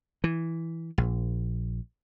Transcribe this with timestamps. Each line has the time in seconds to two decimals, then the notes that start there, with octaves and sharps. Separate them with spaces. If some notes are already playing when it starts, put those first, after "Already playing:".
0.24 E3
0.98 A#1